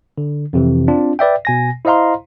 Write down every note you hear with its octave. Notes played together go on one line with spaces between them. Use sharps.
D3
F2 C3 E3
C4 D4 F4
B4 D5 E5 G5
B2 G#5 A#6
E4 C5 D#5 F5 A#5 C6